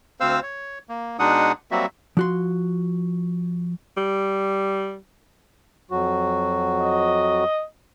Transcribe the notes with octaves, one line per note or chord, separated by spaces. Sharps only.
D2 C4 C5 F5 E6
C#5
A#3
B2 G#3 D4 D#4 F#5 D#6
F#3 G3 A#3 C4 F#4 E5
F3 F#4 C6
G3
F2 F#3 F#4
D#5